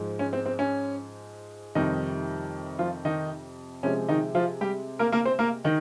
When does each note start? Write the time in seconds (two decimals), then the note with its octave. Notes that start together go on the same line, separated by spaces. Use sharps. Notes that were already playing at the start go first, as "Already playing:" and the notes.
Already playing: G#2 F3 G#3
0.19 C#4
0.33 C4
0.46 C4
0.59 C#4
1.75 F2 C3 D#3 G3 D#4
2.79 F3 F4
3.05 D#3 D#4
3.83 C3 F3 G#3 C#4
4.09 D#3 D#4
4.35 F3 F4
4.61 G3 G4
4.99 A#3 A#4
5.12 A#3 A#4
5.25 C4 C5
5.39 A#3 A#4
5.64 D#3 D#4